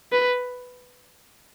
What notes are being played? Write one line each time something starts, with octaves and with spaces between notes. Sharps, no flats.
B4